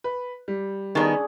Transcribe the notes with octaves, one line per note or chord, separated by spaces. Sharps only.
B4
G3
D#3 B3 C#4 D4 G#4